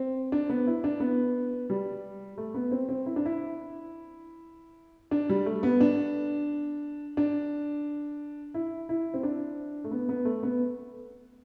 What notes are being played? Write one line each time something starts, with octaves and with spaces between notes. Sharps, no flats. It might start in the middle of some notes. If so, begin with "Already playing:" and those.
Already playing: C4
D4
B3
E4
D4
B3
G3
A3
B3
C4
C4
E4
D4
E4
D4
G3
A3
B3
D4
D4
E4
E4
C4
D4
A3
B3
B3
A3
B3